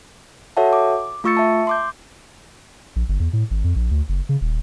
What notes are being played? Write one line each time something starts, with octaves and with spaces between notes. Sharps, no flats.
F#4 A4 C#5 E5 F#5 A5
D6
A3 F4 C#6 E6 A6 C#7
E5 A5
C6 D6 G6
A#1
G1
E2
A2
G#1
F2
A#1
D2
F#1
C#3
D#1